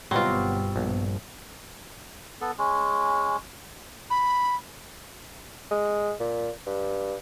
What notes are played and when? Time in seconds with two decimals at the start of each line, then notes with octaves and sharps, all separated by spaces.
0.11 G1 B2 F#3 G3 B3 C4 F4
0.76 A#1 G2
2.41 B3 A4
2.58 G#3 C#4
4.10 B5
5.71 G#3
6.20 A#2
6.66 G2